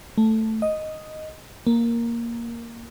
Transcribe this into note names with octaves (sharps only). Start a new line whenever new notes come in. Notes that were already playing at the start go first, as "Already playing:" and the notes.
A3
D#5
A#3